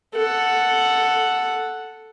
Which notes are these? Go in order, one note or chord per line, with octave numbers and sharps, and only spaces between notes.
A4 F#5